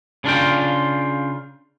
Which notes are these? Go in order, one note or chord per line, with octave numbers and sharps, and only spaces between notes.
C#3 D4 F4 G5